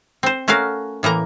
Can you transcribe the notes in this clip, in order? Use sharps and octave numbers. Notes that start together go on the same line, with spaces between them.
C4 C5
A3 C#4 F#4 A#4 F5
A2 E3 A#3 A#5